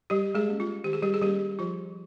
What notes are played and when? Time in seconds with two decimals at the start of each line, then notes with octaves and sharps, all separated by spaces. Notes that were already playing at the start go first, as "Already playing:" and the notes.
0.10 G3 G4
0.35 G#3 G#4
0.48 A#3 C#4
0.60 F4
0.84 D#3 G4
0.93 G#4
1.02 G3 G4
1.14 G#4
1.21 G3 A#3 C#4 G4
1.59 F3 F4